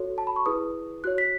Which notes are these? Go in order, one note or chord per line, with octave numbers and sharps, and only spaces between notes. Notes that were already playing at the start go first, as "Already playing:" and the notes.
Already playing: F#4 A4 C#5
A5
B5
C#6
E4 G#4 B4 D#6
F#4 C#5 F#6
B6